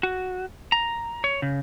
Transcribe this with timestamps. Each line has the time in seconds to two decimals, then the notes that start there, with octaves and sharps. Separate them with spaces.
0.03 F#4
0.72 A#5
1.24 C#5
1.42 C#3